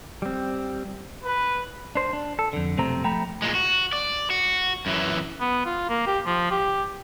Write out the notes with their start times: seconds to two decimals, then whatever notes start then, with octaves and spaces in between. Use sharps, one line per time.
0.22 G3 C4
1.24 B4
1.95 D4 C5
2.13 D4
2.39 A4
2.53 F2 D3
2.77 B1 F2 C3 A3 C4 A#5
3.04 F3 A3 G5 A#5 B5
3.42 A#2 G#3
3.55 F#4
3.93 D5
4.30 F#4
4.86 F#2 E3
5.40 B3
5.66 F4
5.89 A#3
6.07 G4
6.26 F3
6.51 G4